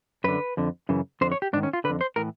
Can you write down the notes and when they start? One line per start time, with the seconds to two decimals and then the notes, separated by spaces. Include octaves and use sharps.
0.24 F#2 D3 B4
0.57 F2 D3
0.89 F#2 C#3 E3
1.21 F2 D3 C5
1.32 C#5
1.42 G4
1.53 G#2 D4
1.57 D#3
1.63 C#4
1.73 F4
1.84 D3 B4
1.90 F2
2.01 C5
2.16 A2 E3 A#4